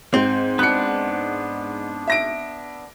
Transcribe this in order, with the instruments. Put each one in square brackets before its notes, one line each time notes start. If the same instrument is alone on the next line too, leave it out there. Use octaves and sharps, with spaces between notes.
[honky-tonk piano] G#2 [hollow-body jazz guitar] C4
[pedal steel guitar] B3 D4 [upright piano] F#6 C#7
[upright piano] E5 A#6 D7